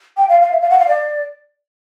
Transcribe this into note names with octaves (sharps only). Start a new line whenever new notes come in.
G5
F5
F5
E5
F5
F#5
F5
D5